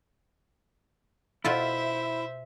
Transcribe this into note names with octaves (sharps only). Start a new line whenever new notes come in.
B2 E4 F4 A4 C5 E5